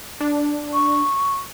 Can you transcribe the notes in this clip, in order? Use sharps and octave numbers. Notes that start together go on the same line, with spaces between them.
D4
C#6